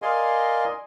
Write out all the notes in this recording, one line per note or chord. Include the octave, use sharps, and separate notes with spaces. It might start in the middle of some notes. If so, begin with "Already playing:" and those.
A#4 D5 D#5 F5 G#5 C6